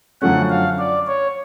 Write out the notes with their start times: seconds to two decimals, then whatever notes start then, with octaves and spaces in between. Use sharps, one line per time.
0.22 F#2 D3 F3 A3 C#4 F#5
0.50 F5
0.79 D5
1.07 C#5